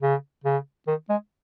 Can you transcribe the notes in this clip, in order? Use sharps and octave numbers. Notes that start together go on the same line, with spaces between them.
C#3
C#3
D#3
G#3